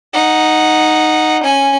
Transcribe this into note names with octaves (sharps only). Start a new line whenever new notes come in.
D#4 F#5
C#4 G#5